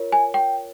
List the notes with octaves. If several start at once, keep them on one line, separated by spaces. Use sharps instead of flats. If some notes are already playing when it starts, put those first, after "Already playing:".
Already playing: F4 A#4 C#5
G#5
G5